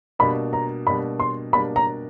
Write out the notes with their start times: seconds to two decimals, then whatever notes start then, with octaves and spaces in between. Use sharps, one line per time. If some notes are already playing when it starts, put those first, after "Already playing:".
0.19 B2 G3 A#3 D4 B5
0.53 A#5
0.87 B2 G3 A#3 D4 B5
1.20 C6
1.53 B2 G3 A#3 D4 B5
1.76 A#5